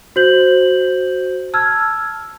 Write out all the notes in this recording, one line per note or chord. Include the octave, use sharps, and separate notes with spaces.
F#4 C5 G6 F#7
A5 E6 F6 G#6